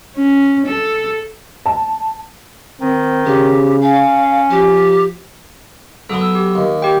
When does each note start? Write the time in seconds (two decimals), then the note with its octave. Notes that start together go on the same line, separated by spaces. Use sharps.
0.16 C#4
0.66 A4
1.66 A5
2.81 D#3 C4
3.26 C#3 G4
3.82 C#4 F5
4.50 F3 G4
6.10 F#3 B3 A4 D#6
6.21 E6
6.35 G4
6.55 D#2
6.82 G4 G5